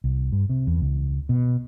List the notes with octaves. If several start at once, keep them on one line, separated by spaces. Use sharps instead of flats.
C2
G2
C3
E2
C#2
B2